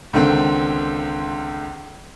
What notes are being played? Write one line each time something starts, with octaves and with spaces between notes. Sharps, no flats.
C#2 D3 D#3 C4